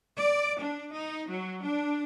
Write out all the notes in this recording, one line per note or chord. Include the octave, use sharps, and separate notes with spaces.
D5
D4
D#4
F#3
D4